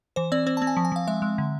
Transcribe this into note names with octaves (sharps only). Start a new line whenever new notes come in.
E3 C5
C4 D5
C4 C5
A5
C4
G#5
F3
G#5
F3 F5
G#3 E5
G#3
D3